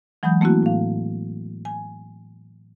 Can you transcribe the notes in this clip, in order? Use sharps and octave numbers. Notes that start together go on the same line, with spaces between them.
E3 F#3 G#3 B5 D#6 G6
A3 A#3 C4 E4 F#4
A2 F5
G#5